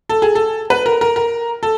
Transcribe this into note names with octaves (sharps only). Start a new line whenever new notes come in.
A4
G#4
A4
B4
A#4
A#4
A#4
A4